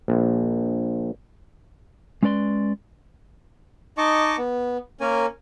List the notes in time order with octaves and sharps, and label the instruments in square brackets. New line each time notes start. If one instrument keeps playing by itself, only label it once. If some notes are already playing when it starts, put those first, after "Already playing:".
[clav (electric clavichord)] A#1
[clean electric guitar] G#3 C#4 B4 D5 C6
[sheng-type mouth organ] D#4 D#5 A5 C#6 D6
B3
A#3 C#4 A#4 G#5